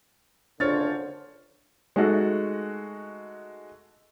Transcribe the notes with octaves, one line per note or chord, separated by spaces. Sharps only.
F#1 D3 D4 F4 C5 C#5 F6 A6
G#3 A3 D#4 F#4 A4